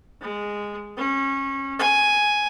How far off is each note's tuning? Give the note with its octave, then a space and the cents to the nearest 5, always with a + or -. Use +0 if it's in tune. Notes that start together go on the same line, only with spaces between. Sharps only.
G#3 -10
C#4 -25
G#5 +5